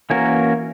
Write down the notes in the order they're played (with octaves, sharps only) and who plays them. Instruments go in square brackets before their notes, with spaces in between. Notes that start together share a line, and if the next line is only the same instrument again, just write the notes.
[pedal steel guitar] E3 A#3 C#4 F#4 A#4